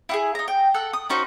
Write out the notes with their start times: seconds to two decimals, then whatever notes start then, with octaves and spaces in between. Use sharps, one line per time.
0.09 E4 F#4 G#4
0.35 D#4 A#5
0.48 G5
0.74 A4 F#5 E6
0.93 D#6
1.09 C#4 D#4 F#4 C5